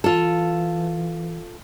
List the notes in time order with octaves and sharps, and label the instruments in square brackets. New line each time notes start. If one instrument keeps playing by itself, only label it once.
[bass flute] E3 [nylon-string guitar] F4 A4